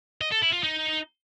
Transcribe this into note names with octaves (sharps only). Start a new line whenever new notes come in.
D#5
A4
E4
F4
D#4